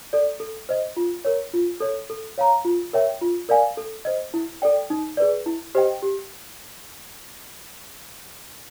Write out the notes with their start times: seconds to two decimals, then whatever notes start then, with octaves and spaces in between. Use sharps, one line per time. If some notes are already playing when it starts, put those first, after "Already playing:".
0.13 A4 D5
0.40 A4
0.69 C5 D#5
0.97 F4
1.25 A#4 C#5
1.53 F4
1.80 A4 C#5
2.10 A4
2.38 C#5 F5 A#5
2.65 F4
2.93 A#4 C#5 E5 G5
3.21 F4
3.49 A#4 D5 F5 G#5
3.77 A4
4.05 C5 D#5
4.34 E4
4.62 A4 D5 G5
4.90 D#4
5.17 G#4 B4 D5
5.46 E4
5.75 G4 C5 D#5 G5
6.02 G4